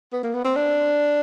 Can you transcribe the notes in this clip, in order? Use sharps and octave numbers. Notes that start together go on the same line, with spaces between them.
B3
A#3
B3
C4
D4